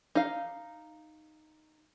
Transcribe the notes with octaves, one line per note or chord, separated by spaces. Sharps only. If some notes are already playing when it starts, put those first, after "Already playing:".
D#4 F5